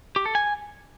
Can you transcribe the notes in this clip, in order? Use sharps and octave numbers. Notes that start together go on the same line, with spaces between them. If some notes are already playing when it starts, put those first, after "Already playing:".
G4
A4
G#5